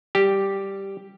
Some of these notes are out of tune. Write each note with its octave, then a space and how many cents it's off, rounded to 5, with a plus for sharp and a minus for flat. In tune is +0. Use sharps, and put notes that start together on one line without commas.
G3 +0 G4 +0